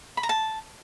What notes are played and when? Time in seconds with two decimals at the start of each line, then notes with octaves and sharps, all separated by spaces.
0.17 B5
0.23 A#5
0.29 A5